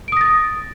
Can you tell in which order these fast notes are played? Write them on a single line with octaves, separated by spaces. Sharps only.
D7 D#6 A#6 A6